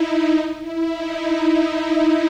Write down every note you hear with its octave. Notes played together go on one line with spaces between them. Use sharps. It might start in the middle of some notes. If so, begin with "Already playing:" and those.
Already playing: D#4 E4
D#4
E4
D#4